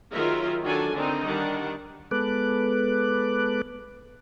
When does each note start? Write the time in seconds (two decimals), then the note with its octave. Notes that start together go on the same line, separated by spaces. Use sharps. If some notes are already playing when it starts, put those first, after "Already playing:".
0.13 D#3 F#3 F4 G#4 A#4 E5
0.63 D#3 F#3 D4 A4 D5 G#5
0.94 D3 D#3 C4 D4 D#4
1.25 D#3 G3 D4 F#5
2.11 G#3 B3 A4 B4 D6 F#6